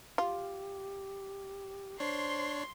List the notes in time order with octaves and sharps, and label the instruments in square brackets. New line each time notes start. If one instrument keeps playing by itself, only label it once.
[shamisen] F4 [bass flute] G4
[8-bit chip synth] D4 C#5 [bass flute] C5 [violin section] C6